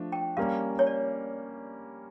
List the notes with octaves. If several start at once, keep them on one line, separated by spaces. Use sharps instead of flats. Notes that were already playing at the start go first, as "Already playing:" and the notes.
Already playing: F3 A3 D4
G5
G3 A#3 C#4 F5
C#5
D5